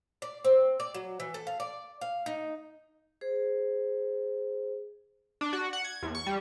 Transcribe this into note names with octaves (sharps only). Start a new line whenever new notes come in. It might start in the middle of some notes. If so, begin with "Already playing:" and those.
D5
C4
D5
F#3
E3
A4
F5
D5
F5
D#4
G#4 C5
D4
F#4
F#5
G#6
E2
C#6
G3